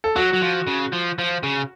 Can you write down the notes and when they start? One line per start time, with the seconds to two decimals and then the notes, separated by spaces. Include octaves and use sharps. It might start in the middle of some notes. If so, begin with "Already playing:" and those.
0.04 A4
0.16 F#3 F#4
0.33 F#3
0.42 F3
0.67 C#3
0.92 F3
1.19 F3
1.43 C#3